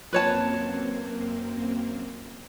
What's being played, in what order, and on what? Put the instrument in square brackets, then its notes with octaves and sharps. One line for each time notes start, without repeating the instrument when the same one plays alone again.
[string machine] F#2 A#3 C4 [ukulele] B4 C#5 A5